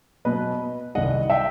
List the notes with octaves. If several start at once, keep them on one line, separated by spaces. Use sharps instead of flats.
B2 F#3 B3 B4 D#5
C2 C3 D#3 G3 D#5 F#5
E5 G5